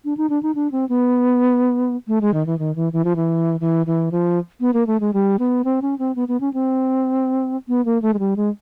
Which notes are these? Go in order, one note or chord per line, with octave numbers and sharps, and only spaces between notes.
D4
D#4
D4
D#4
D4
C4
B3
A3
G#3
D#3
E3
D#3
E3
E3
F3
E3
E3
E3
F3
B3
A#3
A3
G#3
G3
B3
C4
C#4
C4
B3
B3
C#4
C4
B3
A#3
A3
G#3
G3
G#3